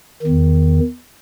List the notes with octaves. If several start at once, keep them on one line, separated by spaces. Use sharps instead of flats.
D#3
E2